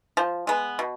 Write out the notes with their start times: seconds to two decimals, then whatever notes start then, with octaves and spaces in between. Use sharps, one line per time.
0.17 F3
0.47 G#3 B3
0.79 B2